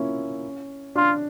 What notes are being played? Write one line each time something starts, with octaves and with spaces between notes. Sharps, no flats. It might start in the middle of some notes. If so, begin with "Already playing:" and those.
Already playing: A#3 C#4 E4 F4
D4 F4